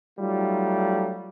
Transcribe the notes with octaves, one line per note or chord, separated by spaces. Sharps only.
F#3 G3 A3 D#4 F4